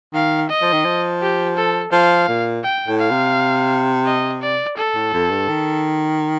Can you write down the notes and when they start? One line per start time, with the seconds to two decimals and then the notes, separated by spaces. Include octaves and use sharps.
0.14 D#3 F5
0.50 D#5
0.62 F3
0.73 D#3
0.85 F3
1.22 G4
1.57 A4
1.92 F3 F5
2.29 A#2
2.63 G5
2.87 A2
2.99 F5
3.11 C3
4.06 D#5
4.42 D5
4.77 A4
4.95 A2
5.13 F2
5.30 G2
5.49 D#3